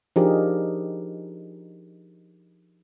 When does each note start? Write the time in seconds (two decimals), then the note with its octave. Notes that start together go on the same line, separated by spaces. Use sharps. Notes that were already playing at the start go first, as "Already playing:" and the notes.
0.16 F3 D4 D#4 G4 G#4 A#4